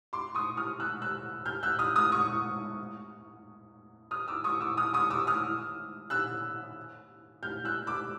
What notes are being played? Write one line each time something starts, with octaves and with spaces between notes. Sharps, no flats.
C6 D6
C#6 D#6
D#6 F6
E6 F#6
E6 F#6
F6 G6
E6 F#6
D#6 F6
D#6 F6
C#6 D#6
D#6 F6
D6 E6
C#6 D#6
D6 E6
D#6 F6
C#6 D#6
D6 E6
D#6 F6
E6 F#6
F6 G6
E6 F#6
D6 E6